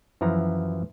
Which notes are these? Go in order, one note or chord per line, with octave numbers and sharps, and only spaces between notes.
F#2 E3 F3 A#5